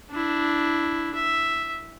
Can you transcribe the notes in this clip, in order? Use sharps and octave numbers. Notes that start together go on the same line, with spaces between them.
D4 E4
E5